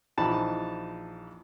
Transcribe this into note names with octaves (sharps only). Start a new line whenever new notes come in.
A#1 E3 F3 D#4 A5 B5